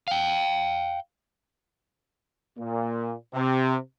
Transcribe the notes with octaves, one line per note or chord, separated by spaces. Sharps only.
F5 G5
A#2
C3